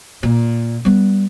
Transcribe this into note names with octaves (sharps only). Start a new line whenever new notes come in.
A#2
G3 B3